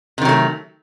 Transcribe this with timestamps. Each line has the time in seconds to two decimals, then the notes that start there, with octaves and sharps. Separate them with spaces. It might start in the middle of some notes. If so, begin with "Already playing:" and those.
0.18 C3
0.21 D#3
0.25 F#3
0.29 A3